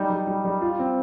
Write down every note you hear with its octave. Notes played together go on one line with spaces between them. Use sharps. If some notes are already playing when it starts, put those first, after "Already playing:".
Already playing: G3 D#4
G3
G3
G3
F4
C4